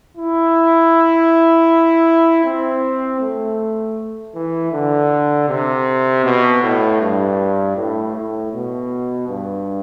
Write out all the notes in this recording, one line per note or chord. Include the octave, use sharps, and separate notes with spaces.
E4
C4
A3
E3
D3
C3
B2
A2
G2
A2
A2
B2
G2